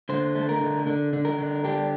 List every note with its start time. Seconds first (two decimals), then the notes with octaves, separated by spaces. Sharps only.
0.09 D3 C5
0.35 A3
0.49 A#4
0.61 D3
0.87 D3
1.13 D3
1.25 A#4
1.39 D3
1.64 D4 G4